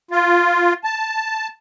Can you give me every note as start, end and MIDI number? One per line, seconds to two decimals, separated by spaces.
0.11 0.73 65
0.84 1.48 81